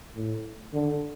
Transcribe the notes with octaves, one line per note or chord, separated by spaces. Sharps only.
A2
D3